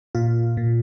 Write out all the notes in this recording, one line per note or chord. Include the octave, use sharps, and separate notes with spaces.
A#2 F4
A#2